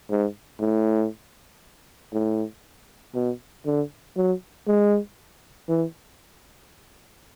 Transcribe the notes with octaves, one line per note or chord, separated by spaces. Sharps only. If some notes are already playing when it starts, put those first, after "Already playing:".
G#2
A2
A2
B2
D3
F#3
G#3
E3